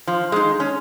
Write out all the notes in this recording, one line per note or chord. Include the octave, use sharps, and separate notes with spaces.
F3
G#3 D#4
C#4